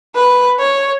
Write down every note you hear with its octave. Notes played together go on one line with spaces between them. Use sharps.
B4
C#5